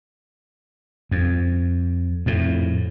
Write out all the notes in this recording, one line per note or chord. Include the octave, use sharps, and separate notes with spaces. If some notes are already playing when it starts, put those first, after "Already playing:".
F2
F2 A2